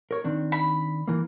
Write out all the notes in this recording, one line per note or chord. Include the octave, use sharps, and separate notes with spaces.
A#4 C#5
D#3 C4 D4
B5
E3 A#3